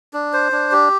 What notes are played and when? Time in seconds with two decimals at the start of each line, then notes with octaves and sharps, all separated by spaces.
0.13 D4
0.33 C5
0.52 D4
0.72 G4